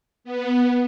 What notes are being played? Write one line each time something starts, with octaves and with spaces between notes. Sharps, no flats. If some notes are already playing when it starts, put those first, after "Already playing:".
B3